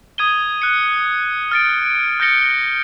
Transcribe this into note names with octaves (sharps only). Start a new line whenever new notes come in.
D#6 G#6 D#7 G7
F#6 C#7
F6 A6 D7
F6 G6 A6 A#6 C#7 G7